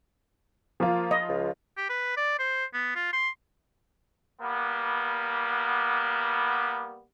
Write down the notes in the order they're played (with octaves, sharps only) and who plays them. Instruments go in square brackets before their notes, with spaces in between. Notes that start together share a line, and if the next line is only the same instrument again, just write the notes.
[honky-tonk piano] F3 F4 [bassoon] A#3
[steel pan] D#5
[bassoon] C#2
[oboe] G4
B4
D5
C5
B3
F4
C6
[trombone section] G3 A#3 B3